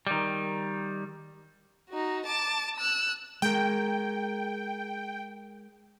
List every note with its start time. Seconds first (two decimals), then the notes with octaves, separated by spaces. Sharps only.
0.07 D#3 G3
1.90 D#4 F#4
2.26 A5 D6
2.77 E6 F#6
3.42 G#3 A#4 G5